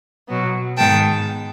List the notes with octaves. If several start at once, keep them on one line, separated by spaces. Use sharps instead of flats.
B2 F#3 B3
G#2 D#3 G#3 B3 G5 A5